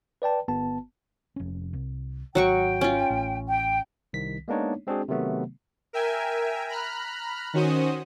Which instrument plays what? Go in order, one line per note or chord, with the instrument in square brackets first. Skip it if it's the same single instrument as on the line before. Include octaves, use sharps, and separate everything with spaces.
[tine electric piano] B4 D5 G5 A5
G1 B3 A5
[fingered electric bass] F1 C#4
C2
[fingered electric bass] G#1 [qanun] F#3 F#4 C#6 [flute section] G5
[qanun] C#4 F4
[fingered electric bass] A1
[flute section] G5
[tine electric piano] C2 D#3 B6
G#3 A#3 B3 D4 D#4 C#5
G#3 C4 D4 F#4 G#4
C3 D#3 F#3 A3 B3
[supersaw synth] A#4 E5 G5 G#5
A#5 B5 F6 F#6
D#3 C#4 F#4 C5 D#6